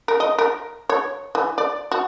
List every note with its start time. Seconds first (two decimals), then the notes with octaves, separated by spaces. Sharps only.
0.08 A#4
0.20 D#5
0.38 A#4
0.89 C#5
1.35 E3
1.58 D5
1.91 F#4